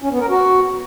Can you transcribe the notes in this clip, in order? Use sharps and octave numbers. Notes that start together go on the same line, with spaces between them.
C#4
B3
A#4
F#4